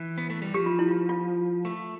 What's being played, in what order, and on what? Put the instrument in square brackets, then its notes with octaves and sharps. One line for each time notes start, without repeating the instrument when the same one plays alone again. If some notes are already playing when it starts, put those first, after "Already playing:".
Already playing: [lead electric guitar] E3
B3
A3
G3
[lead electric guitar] F3 [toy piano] G4
[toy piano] F4
E4
F4
F4
[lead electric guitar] A3